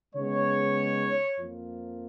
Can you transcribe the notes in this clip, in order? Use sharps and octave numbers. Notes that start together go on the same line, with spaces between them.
C#3 G#3 B3 D#4 C#5
F2 F3 A#3 F4